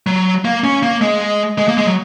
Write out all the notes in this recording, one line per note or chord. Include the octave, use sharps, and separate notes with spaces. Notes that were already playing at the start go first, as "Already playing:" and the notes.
F#3
A#3
C#4
A#3
G#3
G#3
A#3
G#3
F#3